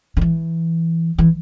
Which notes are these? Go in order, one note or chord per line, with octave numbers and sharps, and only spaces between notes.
D3
E3
E3